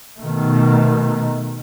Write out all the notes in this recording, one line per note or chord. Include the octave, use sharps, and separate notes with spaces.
B2 D#3 A3